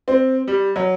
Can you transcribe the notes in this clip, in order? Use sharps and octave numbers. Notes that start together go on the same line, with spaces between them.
C4
G3
F#3